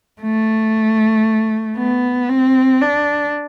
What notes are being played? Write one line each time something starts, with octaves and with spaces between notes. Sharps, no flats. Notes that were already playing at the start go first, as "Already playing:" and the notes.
A3
B3
C4
D4